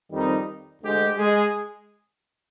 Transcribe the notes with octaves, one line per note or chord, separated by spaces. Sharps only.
F2 D#3 G3 C4 D#4
D2 D3 G#3 G4
G#3 G#4